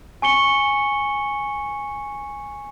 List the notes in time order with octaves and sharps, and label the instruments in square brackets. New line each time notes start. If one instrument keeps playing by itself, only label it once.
[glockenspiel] G#5 C#6 C#7 G7